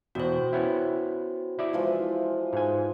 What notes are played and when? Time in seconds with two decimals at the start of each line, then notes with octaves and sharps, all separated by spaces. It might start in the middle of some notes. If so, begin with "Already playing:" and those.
0.15 E2 B2 F#4 C5 G5
0.53 B3 C#4 E4
1.59 E4 D5 E5
1.73 E3 F3 G#3
2.53 G#2 G#5